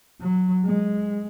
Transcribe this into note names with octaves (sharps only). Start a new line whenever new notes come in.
F#3
G#3